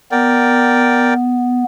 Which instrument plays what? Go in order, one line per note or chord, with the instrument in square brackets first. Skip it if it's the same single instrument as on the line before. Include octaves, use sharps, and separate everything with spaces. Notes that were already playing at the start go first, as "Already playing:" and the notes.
[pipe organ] B3 [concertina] A#4 D5 G5